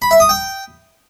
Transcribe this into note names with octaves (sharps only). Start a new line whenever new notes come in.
B5
E5
D#6
G5